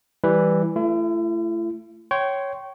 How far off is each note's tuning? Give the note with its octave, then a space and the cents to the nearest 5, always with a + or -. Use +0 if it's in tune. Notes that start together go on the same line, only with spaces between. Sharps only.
E3 +0 G3 +0 B4 +0
A3 +0 E4 +40
C#5 +0 G5 -25 C6 -5